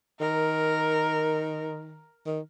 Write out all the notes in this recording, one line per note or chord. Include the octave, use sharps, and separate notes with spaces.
D#3 A#4
D#3